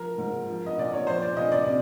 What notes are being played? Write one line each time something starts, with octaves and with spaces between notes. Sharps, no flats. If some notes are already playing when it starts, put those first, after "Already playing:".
Already playing: F3 A#4
G#2
F3
D#5
A#2 D5
C#5
F3 C5
D5
A#2 D#5
D5
C3